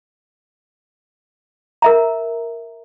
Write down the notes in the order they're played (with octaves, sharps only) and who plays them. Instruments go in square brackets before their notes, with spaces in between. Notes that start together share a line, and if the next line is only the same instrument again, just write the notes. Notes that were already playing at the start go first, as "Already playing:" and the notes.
[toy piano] A#4 E5 A#5